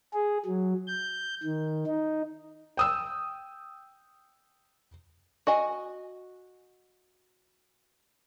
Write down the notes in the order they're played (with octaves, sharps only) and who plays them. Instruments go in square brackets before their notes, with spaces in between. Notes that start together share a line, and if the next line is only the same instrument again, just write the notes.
[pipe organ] G#4
F#3
G6
D#3
D#4
[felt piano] G5 D#6 E6
[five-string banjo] F#4 D#5 G#5